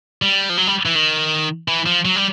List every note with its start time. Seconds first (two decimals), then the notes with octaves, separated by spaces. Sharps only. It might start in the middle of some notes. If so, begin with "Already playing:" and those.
0.22 G3
0.50 F3
0.57 F#3
0.67 G3
0.86 E3
0.95 D#3
1.68 E3
1.86 F3
2.05 F#3
2.16 G3